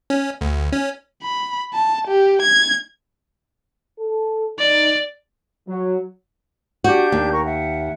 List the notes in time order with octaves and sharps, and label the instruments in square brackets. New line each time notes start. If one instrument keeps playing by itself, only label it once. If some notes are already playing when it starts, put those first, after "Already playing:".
[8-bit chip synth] C#4
D2
C#4
[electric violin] B5
A5
G4
G#6
[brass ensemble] A4
[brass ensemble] D#4 [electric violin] D5
[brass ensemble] F#3
[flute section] D4 G4 G6 [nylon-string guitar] F#4
[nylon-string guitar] D#2
[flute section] A#4 C#6
E5 F#5